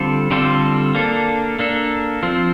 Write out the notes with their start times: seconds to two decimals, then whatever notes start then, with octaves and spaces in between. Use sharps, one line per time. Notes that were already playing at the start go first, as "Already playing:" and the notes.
Already playing: D3 G3 C4 F4 A4
0.31 D3 G3 C4 F4 A4
0.95 A#3 D4 A4
1.59 A#3 D4 A4
2.23 F3 C4 F4